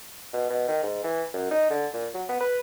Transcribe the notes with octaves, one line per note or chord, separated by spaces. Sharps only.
B2
B2
D#3
G#2
E3
F#2
D#4
D3
A#2
F#3
B3
B4